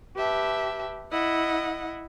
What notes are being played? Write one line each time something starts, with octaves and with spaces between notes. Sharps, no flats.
G4 B4 E5 A5
E4 D#5 F#5